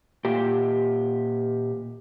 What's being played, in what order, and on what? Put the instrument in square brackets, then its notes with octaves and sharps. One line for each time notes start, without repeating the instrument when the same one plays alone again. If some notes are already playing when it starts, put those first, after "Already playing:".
[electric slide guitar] A#2 G4